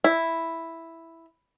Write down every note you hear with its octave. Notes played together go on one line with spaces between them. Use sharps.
E4